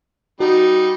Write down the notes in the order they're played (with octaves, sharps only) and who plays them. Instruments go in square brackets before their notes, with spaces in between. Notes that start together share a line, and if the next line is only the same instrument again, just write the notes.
[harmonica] G3 D#4 [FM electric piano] F#4